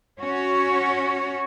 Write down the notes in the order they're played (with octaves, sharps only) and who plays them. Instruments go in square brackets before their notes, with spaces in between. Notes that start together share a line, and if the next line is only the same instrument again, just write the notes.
[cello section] C#4 F#4 C#5